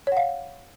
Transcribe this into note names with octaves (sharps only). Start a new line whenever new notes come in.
C#5 F5 F#5